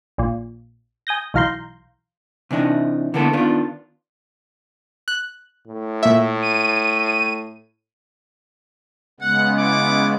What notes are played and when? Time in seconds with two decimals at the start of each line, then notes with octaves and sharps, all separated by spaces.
0.18 A#1 A#2
1.07 G#5 D#6 G6 A#6
1.34 B1 E3 F5 A#5 C6 G6
2.51 C3 E3 D4 D#4
3.14 D3 E3 A#3 B3 A4
3.33 D#3 B3 D4 F4
5.08 F#6
5.68 A2
6.03 A#2 E5
6.42 D#7
9.20 C#3 G#3 B3 F#5
9.57 E4 F#5 D6